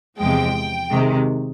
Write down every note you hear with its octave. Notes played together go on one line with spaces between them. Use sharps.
E2 C3 F3 G#3 G5
C3 D#3 G#3